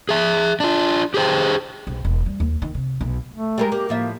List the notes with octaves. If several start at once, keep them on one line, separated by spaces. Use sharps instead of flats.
G#4 E5
D4 F4
G4 G#4 C5 G5
B1
E1
G3
D#2
D#3
C3
B1
A3
G3 G#3 A#4
A#3 G4
A2 F3 A#3 E5